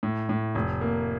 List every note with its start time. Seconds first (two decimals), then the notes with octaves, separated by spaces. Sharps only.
0.03 A2
0.29 A2
0.55 F1
0.81 A#3